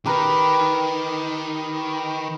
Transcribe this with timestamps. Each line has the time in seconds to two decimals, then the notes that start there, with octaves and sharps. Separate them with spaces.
0.06 D#3 G4 A#4 B4